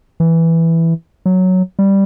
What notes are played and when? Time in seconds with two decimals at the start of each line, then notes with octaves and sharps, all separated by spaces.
0.20 E3
1.26 F#3
1.79 G3